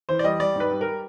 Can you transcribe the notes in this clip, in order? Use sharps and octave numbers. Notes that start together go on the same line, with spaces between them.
E3 C5
D5
G3 D#5
G3 D5
G#2 B4
G3
A#4